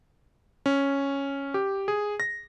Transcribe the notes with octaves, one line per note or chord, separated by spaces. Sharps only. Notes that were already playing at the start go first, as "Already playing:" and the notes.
C#4
G4
G#4
A#6